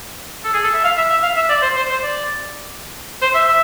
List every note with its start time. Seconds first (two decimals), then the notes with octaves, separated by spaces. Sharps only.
0.44 A4
0.54 G#4
0.64 A4
0.74 E5
0.84 F5
0.97 E5
1.10 E5
1.23 F5
1.36 E5
1.50 D5
1.62 C5
1.76 C5
1.90 C5
2.03 D5
3.22 C5
3.35 E5
3.48 E5